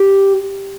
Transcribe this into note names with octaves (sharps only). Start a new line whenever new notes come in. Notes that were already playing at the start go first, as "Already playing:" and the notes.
Already playing: G4